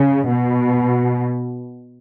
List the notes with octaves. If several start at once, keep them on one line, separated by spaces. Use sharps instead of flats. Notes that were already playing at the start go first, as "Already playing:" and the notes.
Already playing: C#3
B2